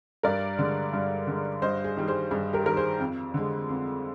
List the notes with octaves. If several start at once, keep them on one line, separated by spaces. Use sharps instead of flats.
G2 A#4 D5
D3 G#3
G2
D3 G#3
G2 C5 D#5
G#4
D#3 G3
G#4 C5
G2 G#4
G4 A#4
D#3 G3 A#4
G#4 C5
F2
D3 G#3
F2